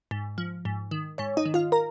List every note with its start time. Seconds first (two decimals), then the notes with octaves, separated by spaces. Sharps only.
0.11 G#2
0.38 F3
0.65 G#2
0.91 D#3
1.18 G#2 C#5
1.37 D#4 D#5
1.46 D#3
1.54 F4 F5
1.72 A#4 A#5